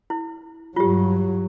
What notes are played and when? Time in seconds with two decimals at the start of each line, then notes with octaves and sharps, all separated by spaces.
0.10 E4
0.76 G2 F#3 F4 G4